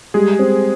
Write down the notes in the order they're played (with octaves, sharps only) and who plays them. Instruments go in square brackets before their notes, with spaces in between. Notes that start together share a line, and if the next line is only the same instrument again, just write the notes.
[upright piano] G3 [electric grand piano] G#3 G#4
[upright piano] C4